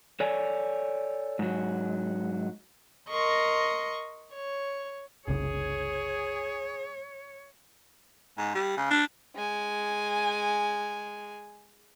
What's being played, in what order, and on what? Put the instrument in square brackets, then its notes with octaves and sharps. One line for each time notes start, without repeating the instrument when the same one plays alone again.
[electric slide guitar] A4 C#5 D5 G#5
G#2 F#3
[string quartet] A#4 D#5 C6 C#6
C#5
[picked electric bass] F#1 C2 C#3 [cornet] G#4 [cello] C#5
[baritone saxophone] G#2
G3
C#3
D4
[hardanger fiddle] G#3 G#5